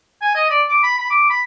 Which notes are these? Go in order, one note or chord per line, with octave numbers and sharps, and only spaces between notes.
G#5
D#5
D5
D6
B5
B5
D6
B5